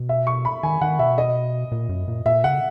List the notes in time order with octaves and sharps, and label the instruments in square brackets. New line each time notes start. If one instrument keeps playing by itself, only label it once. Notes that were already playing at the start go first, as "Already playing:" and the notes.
Already playing: [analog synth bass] B2
[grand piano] E5
C#6
B5
[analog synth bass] D#3 [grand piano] G#5
[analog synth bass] D#3 [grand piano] F#5
[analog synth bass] B2 [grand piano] E5
[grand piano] D#5
[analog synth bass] A#2
F#2
A#2
[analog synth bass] A#2 [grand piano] E5
[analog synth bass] C#3 [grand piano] F#5